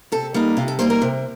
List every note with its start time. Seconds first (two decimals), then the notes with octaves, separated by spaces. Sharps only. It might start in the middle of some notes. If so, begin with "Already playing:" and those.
0.12 C3 A4
0.34 G3 A#3 D#4
0.57 C3 F4
0.68 A4
0.79 G3 A#3 D#4 C5
0.90 A#4
1.02 C3